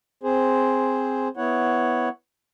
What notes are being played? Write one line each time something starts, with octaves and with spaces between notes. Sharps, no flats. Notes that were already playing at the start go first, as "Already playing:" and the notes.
C4 G#4 C5
B3 E4 C#5 F#5